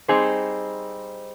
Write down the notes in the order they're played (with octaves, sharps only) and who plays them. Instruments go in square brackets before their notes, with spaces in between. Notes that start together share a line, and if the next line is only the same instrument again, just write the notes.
[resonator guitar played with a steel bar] G3 C4 D#4 G#4 C5